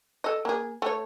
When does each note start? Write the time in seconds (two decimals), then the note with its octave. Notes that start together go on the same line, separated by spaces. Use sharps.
0.24 A4 D#5
0.45 A#3 G#4
0.82 A3 C#5